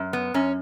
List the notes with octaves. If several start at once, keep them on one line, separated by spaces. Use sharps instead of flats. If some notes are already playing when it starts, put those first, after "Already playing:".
Already playing: F#2
B3
F#2 C#4